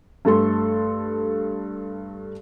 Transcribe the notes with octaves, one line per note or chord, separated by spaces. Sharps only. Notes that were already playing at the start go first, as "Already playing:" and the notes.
G2 A3 A4 C6